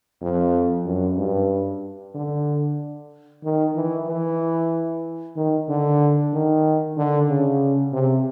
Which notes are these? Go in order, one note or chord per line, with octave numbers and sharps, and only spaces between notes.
F2
F#2
G2
D3
D#3
E3
E3
D#3
D3
D#3
D3
C#3
C3